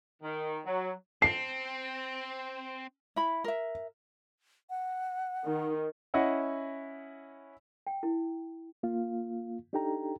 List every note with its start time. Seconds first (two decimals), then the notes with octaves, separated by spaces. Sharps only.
0.23 D#3
0.66 F#3
1.22 C4 A5 C7
3.16 E4 B5
3.44 A#4 E5
4.70 F#5
5.45 D#3
6.14 C#4 E4 D#5 F#5
7.87 G5
8.03 E4
8.83 A#3 F4 F5
9.73 D4 D#4 G4 A4 G5 A#5